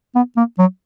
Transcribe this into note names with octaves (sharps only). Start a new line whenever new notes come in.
B3
A#3
F#3